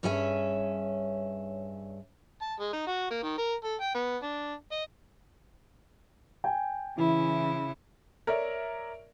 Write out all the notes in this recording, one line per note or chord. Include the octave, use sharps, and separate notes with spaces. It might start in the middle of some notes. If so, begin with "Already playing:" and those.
G2 C#4 G#4 C#5 E5 G#5
A5
G#3
D#4
F#4
A#3
D#3
A#4
A4
G5
B3
D4
D#5
G5 G#5
C#3 E3 E4
A#4 C#5 D5 E5